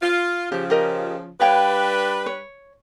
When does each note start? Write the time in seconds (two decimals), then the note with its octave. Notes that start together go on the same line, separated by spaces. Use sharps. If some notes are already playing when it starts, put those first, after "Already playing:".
0.02 F4
0.52 C#3 F3 G4
0.70 G4 A#4 D#5
1.40 G3 D4 B4 C#5 F5 G5
2.26 C#5